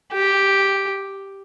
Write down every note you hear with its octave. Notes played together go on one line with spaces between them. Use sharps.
G4